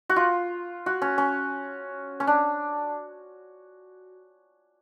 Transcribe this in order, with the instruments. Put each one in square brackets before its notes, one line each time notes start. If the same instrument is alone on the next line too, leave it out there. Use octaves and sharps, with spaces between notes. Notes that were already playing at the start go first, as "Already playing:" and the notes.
[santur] F#4
F4
F#4
C#4
C#4
C#4
D4